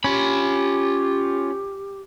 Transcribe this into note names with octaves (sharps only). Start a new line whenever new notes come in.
C#4 F4 G4 B5